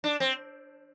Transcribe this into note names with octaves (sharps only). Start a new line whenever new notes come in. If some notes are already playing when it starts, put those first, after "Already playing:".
D4
C4